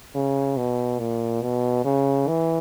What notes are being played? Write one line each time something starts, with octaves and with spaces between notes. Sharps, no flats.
C#3
B2
A#2
B2
C#3
E3